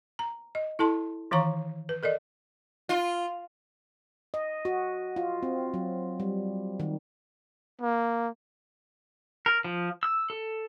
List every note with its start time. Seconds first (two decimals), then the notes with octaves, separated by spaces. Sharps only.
0.19 A#5
0.55 D#5
0.79 E4 A4 A5 C6
1.31 D#3 E3 C#5 F5 A#5 C#6
1.89 B4
2.03 A4 A#4 D5 D#5
2.89 F4
4.34 D#5
4.65 F#4
5.16 F4
5.43 C4
5.74 F#3
6.20 G3
6.80 D#3
7.82 A#3
9.46 A#4
9.64 F3
10.03 E6
10.30 A4